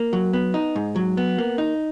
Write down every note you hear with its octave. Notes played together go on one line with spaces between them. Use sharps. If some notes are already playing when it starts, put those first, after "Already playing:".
Already playing: A#3
F#3
B3
D#4
G#2
F#3
B3
A#3
D#4